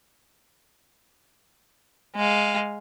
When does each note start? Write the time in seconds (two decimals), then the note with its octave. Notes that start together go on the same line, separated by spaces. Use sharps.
2.16 G#3 F5